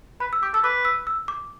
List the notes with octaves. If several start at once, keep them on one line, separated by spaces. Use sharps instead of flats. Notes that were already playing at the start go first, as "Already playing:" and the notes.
B4 B5
E6
G4 D6
A4 E6
B4 D6
E6
E6
D6